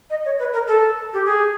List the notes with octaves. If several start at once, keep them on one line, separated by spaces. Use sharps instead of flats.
D#5
C#5
B4
A#4
A4
G4
G#4